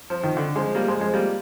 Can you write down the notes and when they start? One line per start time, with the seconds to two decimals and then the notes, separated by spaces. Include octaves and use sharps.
0.10 F3
0.24 D#3
0.37 D3
0.56 F3 G#3
0.75 G3 A#3
0.88 F3 G#3
1.00 F3 G#3
1.14 G3 A#3